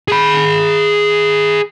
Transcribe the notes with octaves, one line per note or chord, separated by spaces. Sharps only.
G#4 B5